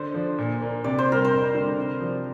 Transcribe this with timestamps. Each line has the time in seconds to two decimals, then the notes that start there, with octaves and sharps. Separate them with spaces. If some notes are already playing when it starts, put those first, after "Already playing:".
Already playing: D3 C5
0.14 F3 D4
0.38 A#2
0.61 A#3 D4
0.84 C3 D5
0.99 C5
1.08 G3 D4 A#4
1.25 C5
1.31 F2
1.55 D3 G3
1.77 C3
2.01 F3 D4